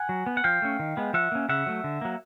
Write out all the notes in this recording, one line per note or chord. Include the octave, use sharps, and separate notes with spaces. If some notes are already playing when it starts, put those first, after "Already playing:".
Already playing: F#5 G#5
F#3
B3
F#5
F3 F5 G5
A3 C#4
D#3
G#3 B3
F3 E5 F#5
A#3 C#4
C#3 E5 F#5
F#3 A3
D3
F#3 A#3